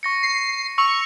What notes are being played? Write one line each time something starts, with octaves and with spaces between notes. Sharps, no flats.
C#6 A#6 C#7
C7
C#6 E6 F7